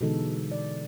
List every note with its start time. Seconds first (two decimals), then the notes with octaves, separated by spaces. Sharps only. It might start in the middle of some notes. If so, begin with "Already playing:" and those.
0.01 B2 D3 E3 G#3 D#4 A4
0.52 D5